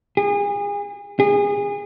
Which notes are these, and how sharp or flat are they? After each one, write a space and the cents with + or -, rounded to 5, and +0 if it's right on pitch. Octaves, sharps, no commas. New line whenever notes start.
G#4 -35
G#4 -30